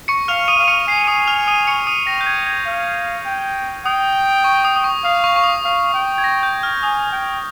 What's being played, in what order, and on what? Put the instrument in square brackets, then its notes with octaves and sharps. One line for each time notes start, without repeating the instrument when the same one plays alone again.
[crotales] C#6 C#7
[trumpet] F5 [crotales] F6 F7
[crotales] D#6 D#7
[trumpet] F5 [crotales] D#7
[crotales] C#6 C#7
[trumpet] G#5 [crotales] C7
[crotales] D#6 D#7
F6 F7
D#6 D#7
C#6 C#7
D#6 D#7
[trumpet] G5 [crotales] A#6
[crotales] G6
G#6
G#6
[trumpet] F5
G5
[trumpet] G5 [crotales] D#6
[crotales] C#6
D#6
D#6
C#6
[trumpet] F5 [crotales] D#6
[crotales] C#6
C#6
D#6
[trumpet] F5
G5
[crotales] G#6
A#6
G6
F6
[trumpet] G#5 [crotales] D#6
[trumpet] G5